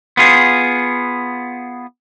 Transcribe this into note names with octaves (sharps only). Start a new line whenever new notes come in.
B3 F4 G#4